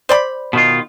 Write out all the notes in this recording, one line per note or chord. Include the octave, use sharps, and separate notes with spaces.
C5 D5 B5
B2 D#3 F4